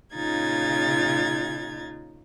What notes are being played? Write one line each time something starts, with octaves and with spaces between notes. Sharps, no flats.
A#2 C#3 D#4 F4 G#6 A6